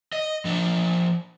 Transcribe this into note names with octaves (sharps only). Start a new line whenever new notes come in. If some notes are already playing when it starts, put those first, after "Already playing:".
D#5
F3 D4